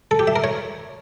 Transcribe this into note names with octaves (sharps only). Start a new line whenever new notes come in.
A4
G4
E5
A#4
C#5